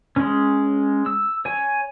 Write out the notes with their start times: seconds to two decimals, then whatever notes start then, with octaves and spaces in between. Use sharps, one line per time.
0.16 G#3 C#4
1.06 E6
1.45 C#5 G#5